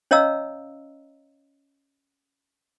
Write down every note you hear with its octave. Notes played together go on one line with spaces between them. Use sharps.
C#4 C#5 D#5 F5 A#5 E6